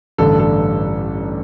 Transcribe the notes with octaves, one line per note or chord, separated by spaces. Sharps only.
A1 G2 D3 A4
A4